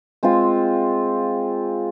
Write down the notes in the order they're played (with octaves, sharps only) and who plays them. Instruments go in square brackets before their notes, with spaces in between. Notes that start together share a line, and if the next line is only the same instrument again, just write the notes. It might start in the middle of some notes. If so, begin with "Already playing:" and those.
[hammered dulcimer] G#3 C4 F4